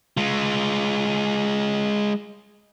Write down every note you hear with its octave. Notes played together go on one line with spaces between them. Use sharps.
G#3 F4